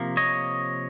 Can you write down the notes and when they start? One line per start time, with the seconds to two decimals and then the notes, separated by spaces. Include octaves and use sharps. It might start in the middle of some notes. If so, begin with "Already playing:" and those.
Already playing: C3 F3 A#3
0.17 C#5 D#5